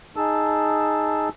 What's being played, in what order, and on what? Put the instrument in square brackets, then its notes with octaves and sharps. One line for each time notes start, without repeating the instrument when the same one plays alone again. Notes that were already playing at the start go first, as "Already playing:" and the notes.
[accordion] D#4 G#4 A5 E6